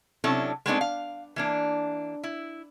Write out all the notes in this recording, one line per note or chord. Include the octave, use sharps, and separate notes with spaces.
C3 F#3 C#4 D4 E4 A4
G#3 A3 B3 C4 D4 D#4
F5
E3 A#3 D4
E4